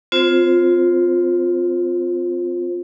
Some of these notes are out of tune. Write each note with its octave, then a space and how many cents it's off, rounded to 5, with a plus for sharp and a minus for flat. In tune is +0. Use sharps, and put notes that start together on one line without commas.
C4 -25 F4 +10 C5 +0